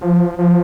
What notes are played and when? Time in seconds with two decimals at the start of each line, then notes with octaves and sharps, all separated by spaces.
0.01 F3
0.39 F3